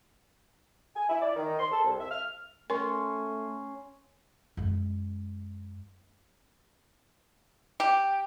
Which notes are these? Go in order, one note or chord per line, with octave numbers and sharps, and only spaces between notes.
G#5
E4
D5
D#3
C6
A4
C2
E5
F6
A3 C#4 A#4 C6
F#2 G#3
G4